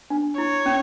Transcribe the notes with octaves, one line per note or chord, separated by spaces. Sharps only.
D4
E4 C#5
C#4